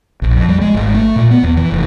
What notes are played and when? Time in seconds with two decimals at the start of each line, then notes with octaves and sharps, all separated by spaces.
0.22 A#1
0.36 F2
0.49 G3
0.61 G#3
0.74 G#1
0.94 A3
1.16 A#2
1.31 B3
1.43 E2
1.57 E3
1.72 F1